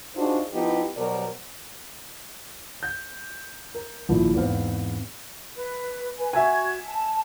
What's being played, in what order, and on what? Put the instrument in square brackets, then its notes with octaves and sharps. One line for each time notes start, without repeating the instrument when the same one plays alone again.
[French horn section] D4 D#4 F4 F#4 G#4 C5
F3 B3 D#4 E4 G4
B2 F#3 G3 A#4 C5 D5
[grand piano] G6
A#4
D#1 A#1 F3 A#3 E4
E2 G#2 C4 B4 C5 F5
[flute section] B4
B4 G#5
[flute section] F#4 G#6 [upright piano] E5 G#5
[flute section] A5